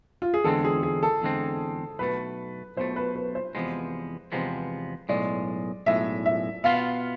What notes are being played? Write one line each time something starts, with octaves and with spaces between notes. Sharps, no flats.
F4
G#4
E2 D3 G#3 C4 A4
G#4
G#4
A4
E2 D3 G#3 C4
B1 B2 A3 B4
B1 B2 A3 C5
B4
B4
C5
E2 C3 F3 G#3 B3
E2 C3 F3 G#3 B3
B1 A2 G#3 D5
B1 A2 G#3 E5
E5
B2 B3 F4 F5